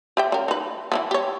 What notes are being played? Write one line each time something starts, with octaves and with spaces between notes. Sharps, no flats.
G4 E5 G5
C#3 A#4
D#4 B4
E3 A#3 B3
G4 C#5